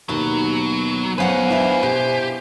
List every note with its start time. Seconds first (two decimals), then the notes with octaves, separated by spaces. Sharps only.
0.09 D#2 B2 F#3
1.18 F#3 B3 B4 C5 F5 F#5 G#5 C6
1.50 E3 D4 E4
1.83 B2 G4